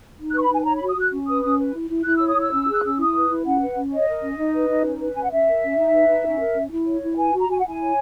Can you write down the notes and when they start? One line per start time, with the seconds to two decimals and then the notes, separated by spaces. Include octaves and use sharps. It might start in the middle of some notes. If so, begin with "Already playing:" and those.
0.19 D#4
0.31 F#6
0.34 B4 C#6
0.41 B5
0.50 D#4 G#5
0.61 G#5
0.66 C#5 A#5
0.76 B5
0.81 F#4
0.89 D#6
0.96 F#4 F#6
1.11 C#4
1.28 B4 D#6
1.43 C#4 D#6
1.58 B4
1.74 E4
1.89 E4
2.04 E4 F#6
2.17 C#5 E6
2.29 D#6
2.36 E4 E6
2.52 C#4
2.68 G#4 F#6
2.83 C#4 E6
2.98 E4 D#6
3.14 B4
3.30 E4
3.45 C#4 F#5
3.60 B4
3.75 C#4
3.91 C#5 D#5
4.07 A#4
4.22 C#4
4.38 D#4
4.54 B4
4.69 D#4
4.85 C#4
4.99 B4
5.14 C#4 G#5
5.23 F#5
5.31 C#4 E5
5.46 A#4
5.63 C#4
5.78 D#4
5.93 B4
6.08 D#4
6.25 C#4
6.39 A#4
6.55 C#4
6.71 E4
6.86 C#5
7.02 E4
7.17 B4 G#5
7.33 F#4
7.41 A#5
7.48 F#4 G#5
7.59 F#5
7.64 E4 G#5
7.79 C#5